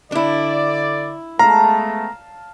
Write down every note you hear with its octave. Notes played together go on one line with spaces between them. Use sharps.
D3 D4 E4 D5
G#3 A3 B3 F5 A5 A#5